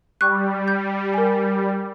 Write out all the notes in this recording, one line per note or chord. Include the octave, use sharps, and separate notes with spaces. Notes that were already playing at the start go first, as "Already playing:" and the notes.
G3 C#6 F#6
G6
A#4 G#5